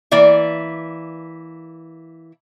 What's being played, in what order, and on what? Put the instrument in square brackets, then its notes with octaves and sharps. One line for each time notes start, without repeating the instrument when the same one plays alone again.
[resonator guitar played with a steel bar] E3 A#3 D5 E5